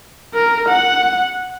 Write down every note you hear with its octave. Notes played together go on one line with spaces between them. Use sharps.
A#4
F#5